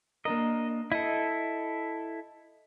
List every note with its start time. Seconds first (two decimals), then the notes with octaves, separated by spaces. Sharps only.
0.25 A#3 D4 A#4 D#5
0.92 E4 A4 D#5